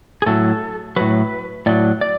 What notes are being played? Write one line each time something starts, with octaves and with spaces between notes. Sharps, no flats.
G#4
A2 F#3 A4
A2 F#3 B4
A2 F#3 D5
D5